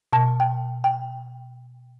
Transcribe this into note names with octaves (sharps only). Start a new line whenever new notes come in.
B2 A5
G5
G5